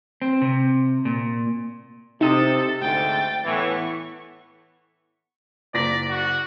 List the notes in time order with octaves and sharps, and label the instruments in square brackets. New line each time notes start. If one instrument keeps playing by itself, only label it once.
[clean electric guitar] C4
C3
A#2
[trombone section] C3 [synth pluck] D#4 D#6 [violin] A4
[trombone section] D2 G#2 [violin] G5 A6
[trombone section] A2 E3 [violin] B3 C#6
[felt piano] F#1 A#6 B6 [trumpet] D5
[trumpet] F#4